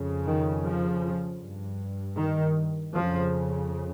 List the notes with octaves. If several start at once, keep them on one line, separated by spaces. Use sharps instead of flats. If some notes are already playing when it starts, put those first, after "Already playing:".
Already playing: F2 C#3
D#3
F3
G2
D#3
F2 C#3 F3